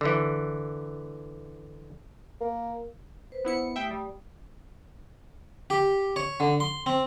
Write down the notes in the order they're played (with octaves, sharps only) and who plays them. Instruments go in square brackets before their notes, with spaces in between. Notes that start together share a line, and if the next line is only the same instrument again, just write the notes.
[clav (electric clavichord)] D3 E3
[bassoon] A#3
[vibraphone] B4 C5
[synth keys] B3 E4 C#7
[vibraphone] A3 G4 D#6 [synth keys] E5 G5
[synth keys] G3
[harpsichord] G4
C#5
D3
C6
C4